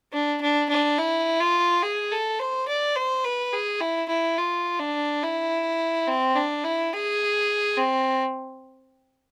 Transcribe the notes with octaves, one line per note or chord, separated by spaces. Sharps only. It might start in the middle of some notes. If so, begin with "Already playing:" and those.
D4
D4
D4
E4
F4
G#4
A4
C5
D5
C5
B4
G#4
E4
E4
F4
D4
E4
C4
D4
E4
G#4
C4